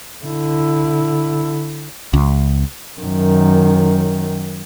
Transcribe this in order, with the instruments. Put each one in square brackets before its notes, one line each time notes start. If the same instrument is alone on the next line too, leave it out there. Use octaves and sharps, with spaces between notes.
[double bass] D3 E4
[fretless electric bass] C#2
[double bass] F#2 D#3